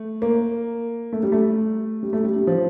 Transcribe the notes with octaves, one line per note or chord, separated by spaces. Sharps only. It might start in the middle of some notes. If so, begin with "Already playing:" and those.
Already playing: A3
A#3
A3
G3
A3
G3
A3
G3
G3
F3